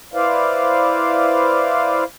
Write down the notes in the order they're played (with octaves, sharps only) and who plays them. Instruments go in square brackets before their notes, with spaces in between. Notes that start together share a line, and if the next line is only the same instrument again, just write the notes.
[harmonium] E4 B4 C5 D5 F5